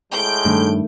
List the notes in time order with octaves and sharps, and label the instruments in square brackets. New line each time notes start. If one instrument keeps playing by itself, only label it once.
[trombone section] A2 G#3 [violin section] G6 D7
[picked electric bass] G2 [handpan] D#3 A3